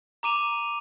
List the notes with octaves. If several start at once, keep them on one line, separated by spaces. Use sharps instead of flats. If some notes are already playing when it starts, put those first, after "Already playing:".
A#5 D6 D#7 F7